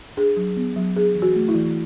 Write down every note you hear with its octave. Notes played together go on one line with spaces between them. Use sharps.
D4 G#4
F#3
B3
F#3
D4 G#4
E3
F#4
A3
E4
E3